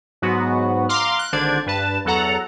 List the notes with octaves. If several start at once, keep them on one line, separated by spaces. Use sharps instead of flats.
G#2 F#3 B3 F#4
F5 A#5 C6 D6 F6
F#6
G#1 D3 D4 C5 D5 G#6
G2 B4 A5
E2 F#3 A4 F#5 A#5